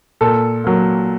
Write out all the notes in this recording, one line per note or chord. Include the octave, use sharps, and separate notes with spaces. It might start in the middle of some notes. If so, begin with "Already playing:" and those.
A#2 A4
F#3 A#3